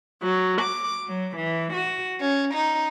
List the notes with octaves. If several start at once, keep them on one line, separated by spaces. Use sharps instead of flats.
F#3
D6
F#3
E3
F#4
C#4
D#4